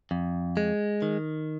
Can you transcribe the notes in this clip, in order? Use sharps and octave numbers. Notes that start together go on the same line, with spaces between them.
F2
G#3
D#3